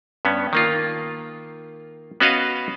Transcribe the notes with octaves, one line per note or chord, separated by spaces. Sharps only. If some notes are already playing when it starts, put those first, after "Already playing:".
G2 B3 C#4
D#3 A#3 F4
B3 C#4 F#4 B4 D#5 F5